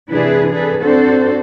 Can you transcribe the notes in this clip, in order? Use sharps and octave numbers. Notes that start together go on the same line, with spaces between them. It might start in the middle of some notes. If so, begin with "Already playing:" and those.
C3 E3 D4 E4 G#4 B4
D4 G#4 A4 B4
C4 D4 F#4 A4 C5